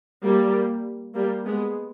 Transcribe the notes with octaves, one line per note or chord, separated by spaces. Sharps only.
G3 A#3
G3 A#3
G#3 B3